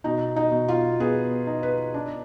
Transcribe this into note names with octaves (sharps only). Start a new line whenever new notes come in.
B2 D#4
D#4
B2
F4
B3 G#4
D#4
B4
D4